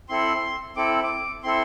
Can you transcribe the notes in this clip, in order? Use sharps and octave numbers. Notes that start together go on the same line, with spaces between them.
C4 E4 A4 C6
C4 E4 A4 D6
D6
C4 E4 A4 C6